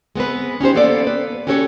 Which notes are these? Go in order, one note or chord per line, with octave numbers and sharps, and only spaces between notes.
G#3 B3 C4 B4
C#4 D#4 G4 C5
A#3 B3 A4 C5 D5
B4
C#4 F#4 G4 A4 C#5